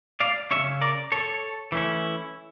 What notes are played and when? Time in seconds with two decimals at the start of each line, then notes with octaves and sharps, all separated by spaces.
0.20 D5 F5
0.51 C#3 F3 C#4 C#5 E5
0.81 A#4 D5
1.12 A4 C#5
1.72 E3 A3 C#4 E4